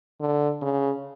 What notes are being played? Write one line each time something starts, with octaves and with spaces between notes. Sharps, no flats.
D3
C#3